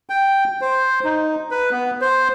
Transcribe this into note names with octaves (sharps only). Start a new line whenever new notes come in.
G5
C5
D#4
B4
B3
C5